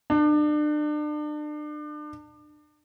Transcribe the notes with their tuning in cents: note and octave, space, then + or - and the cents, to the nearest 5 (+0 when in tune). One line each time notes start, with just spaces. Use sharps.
D4 +35